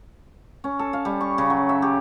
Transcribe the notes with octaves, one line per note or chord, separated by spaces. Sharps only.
C#4
A4
F5
G3
C#6
C#3
F#3
E5
G4